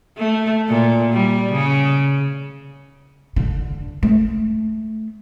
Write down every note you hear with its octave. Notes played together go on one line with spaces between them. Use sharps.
A3
A#2
G3
C#3
D3
A3